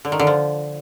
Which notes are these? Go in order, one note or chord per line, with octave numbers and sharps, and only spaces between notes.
D3
D#3
D3
F3